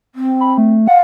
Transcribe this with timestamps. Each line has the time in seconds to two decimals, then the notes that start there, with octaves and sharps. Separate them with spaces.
0.15 C4
0.40 B5
0.58 A3
0.88 F5 F#5